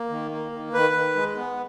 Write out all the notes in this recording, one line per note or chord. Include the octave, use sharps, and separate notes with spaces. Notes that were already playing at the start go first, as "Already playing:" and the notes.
Already playing: A#3
D#3
A#3
D#3
D#3 B4
D#3
G#3
B3